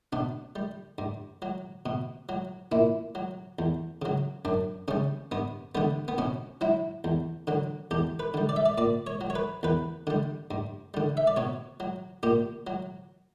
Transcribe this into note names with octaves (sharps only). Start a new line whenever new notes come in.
B2 D4
G3
G2
F#3
B2
F#3
A#2 E4
F#3
E2
C#3 F#3
F#2 D4
C#3 G3 C#4
G2 B3
D3 G3 B3
B3
B2 C#4
F#3 E4
E2
D3 F#3
E2 G4
B4
D3 G3
D5
E5
D5
A#2 D5
C#5
F#3
C#5
B4
E2 B4
D3 G3
G2
D3 G3
E5
D5
B2 C#5
F#3
A#2 G4
F#3